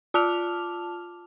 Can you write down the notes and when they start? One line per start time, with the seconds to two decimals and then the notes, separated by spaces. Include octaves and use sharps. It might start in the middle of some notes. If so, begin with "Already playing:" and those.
0.14 F4 A5 D6 F6 F7